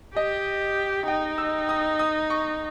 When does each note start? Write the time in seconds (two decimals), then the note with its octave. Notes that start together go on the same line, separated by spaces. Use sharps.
0.16 G4 D#5
1.08 D#4 G5
1.38 E6
1.69 D#6
1.99 D#6
2.30 C#6